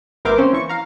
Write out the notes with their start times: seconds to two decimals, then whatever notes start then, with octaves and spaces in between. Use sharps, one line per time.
0.25 A1 B3 A#4 C5 E5 D6
0.38 A#3 C4 C#4 C5
0.53 E3 C#6
0.69 F5 A#5